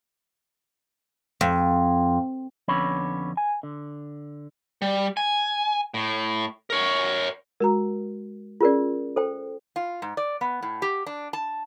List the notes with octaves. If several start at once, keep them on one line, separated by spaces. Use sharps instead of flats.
F2
F2 D3 B3 C#4 C#5 B5
G#5
D3
G3
G#5
A2
A#4 C#5
G#3 F#4 A#4 A#5
C#4 F4 G#4 A#4 D5
A4 C5 G5
F4
G#2
D5
B3
A2
G4
D4
A5